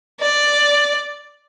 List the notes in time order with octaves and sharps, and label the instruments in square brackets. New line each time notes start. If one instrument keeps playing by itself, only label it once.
[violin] D5